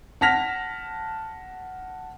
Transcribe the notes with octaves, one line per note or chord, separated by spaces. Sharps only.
F#5 A5 F6 A#6 B6 F7